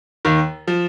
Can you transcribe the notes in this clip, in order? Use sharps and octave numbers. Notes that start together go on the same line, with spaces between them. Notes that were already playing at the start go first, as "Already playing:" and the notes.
D#2 D#3
F3